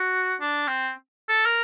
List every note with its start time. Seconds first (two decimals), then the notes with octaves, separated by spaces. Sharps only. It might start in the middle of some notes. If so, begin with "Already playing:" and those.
Already playing: F#4
0.41 D4
0.67 C4
1.29 A4
1.46 A#4